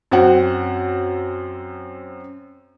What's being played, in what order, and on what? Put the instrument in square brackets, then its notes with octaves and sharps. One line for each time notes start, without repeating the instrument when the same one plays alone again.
[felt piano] F#2 C4 F#5